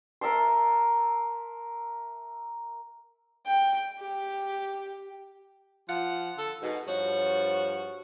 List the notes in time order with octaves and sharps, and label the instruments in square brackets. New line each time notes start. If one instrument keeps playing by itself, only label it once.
[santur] A#4 E5 A5 C6
[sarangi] G5
G4
[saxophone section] F3 F4 F#5
D3 A4
G#2 B2
[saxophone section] G2 F3 F#4 [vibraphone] C#5